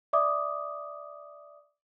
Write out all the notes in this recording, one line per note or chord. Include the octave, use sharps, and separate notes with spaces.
D5 E5 D6 D#6